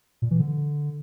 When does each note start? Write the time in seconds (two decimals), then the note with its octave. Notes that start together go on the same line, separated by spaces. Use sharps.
0.22 A#2
0.31 E3
0.40 D3